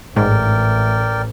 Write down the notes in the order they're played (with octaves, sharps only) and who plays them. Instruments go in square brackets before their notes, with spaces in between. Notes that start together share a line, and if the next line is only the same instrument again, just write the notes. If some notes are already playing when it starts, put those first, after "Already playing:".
[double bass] A1 [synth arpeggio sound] G#2 [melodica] A#4 D5 G5